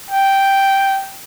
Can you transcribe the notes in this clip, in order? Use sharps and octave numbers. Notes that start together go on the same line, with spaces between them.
G5